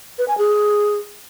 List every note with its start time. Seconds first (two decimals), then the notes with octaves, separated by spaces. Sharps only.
0.18 B4
0.28 G#5
0.38 G#4